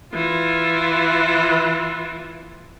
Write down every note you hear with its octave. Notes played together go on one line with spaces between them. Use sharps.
E3 F4